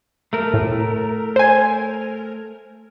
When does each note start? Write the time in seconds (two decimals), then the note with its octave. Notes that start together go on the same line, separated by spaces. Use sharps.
0.33 A3 A#4
0.54 A2
1.36 C5 G#5